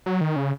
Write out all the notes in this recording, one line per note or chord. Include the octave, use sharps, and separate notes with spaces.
F#3
D#3
C#3